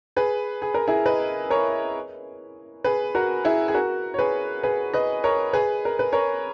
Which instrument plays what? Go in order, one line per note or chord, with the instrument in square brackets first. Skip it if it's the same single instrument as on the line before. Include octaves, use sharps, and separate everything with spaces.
[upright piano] G#4 B4
G#4
A#4
E4 G#4
B4 D#5
A#4 C#5
G#4 B4
F#4 A#4
E4 G#4
G#4
F#4 A#4
C#5
G#4 B4
G#4 B4
B4 D#5
A#4 C#5
G#4 B4
A#4
B4
A#4 C#5